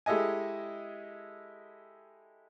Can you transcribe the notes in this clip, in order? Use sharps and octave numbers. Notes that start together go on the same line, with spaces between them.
G#3 E4 G4 A4 D#5 G#5